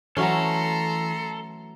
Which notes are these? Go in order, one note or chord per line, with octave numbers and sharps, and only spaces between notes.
E3 F#3 A3 C#4 A4 A#5 C6